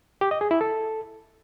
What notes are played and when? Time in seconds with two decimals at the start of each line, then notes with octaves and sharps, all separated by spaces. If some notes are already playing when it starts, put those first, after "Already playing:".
0.21 G4
0.31 D#5
0.41 G#4
0.51 E4
0.61 A4